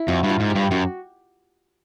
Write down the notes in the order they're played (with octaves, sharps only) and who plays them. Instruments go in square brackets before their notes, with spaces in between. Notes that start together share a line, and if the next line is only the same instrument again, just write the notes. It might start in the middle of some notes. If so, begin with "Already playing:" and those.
Already playing: [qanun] E4
[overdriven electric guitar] F2 [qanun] F#4
[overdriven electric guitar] G2
[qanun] F4
[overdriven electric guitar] G#2
[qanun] G4
[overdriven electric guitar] G2
[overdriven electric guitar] F#2 [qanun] F#4